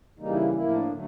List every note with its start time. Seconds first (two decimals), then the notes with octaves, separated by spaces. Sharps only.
0.19 C#3 E3 G3 A#3 D#4
0.31 E4
0.54 A2 F3 A#3 E4
0.70 D4
0.89 D3 F#3 A3